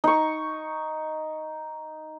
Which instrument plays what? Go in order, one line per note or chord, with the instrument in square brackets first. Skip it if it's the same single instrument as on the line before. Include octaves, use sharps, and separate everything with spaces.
[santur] D#4 C#6